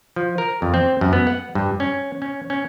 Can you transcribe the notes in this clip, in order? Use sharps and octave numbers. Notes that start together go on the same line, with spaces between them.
F3
A#4
F2
C4
F#2
B3
F#5
G2
C#4
C#4
C#4